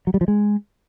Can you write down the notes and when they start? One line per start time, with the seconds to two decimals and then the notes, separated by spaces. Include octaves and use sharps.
0.07 F#3
0.14 G3
0.21 F3
0.28 G#3